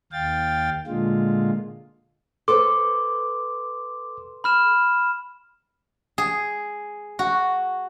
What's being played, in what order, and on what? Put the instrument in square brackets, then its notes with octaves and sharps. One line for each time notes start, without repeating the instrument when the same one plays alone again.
[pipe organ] D#2 F5 G5 A6
A#2 D3 G#3 F4
[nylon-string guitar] A4 B4 C5 [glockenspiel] C6 [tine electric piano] D6
[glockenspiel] B5 F6 E7
[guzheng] G#4
F#4